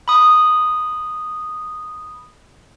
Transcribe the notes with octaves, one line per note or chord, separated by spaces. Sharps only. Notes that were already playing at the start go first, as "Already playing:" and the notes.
B5 D#6